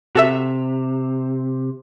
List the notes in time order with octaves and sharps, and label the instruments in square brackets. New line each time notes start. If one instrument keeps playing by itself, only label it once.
[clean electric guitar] C3 [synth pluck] F#4 A4 E5